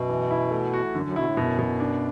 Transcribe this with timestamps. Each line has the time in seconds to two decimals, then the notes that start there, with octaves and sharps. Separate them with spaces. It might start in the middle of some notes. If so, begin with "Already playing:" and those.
Already playing: F#2 B2
0.09 E3
0.31 E4
0.51 A3
0.73 F#4
0.95 F#2 D3
1.05 F#2
1.16 B2 E4
1.26 A2
1.37 F#2 B2
1.59 B2
1.80 D4